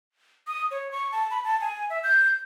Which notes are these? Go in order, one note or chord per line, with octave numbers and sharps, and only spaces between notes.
D#6
C#5
C#6
A5
B5
A5
G#5
E5
G6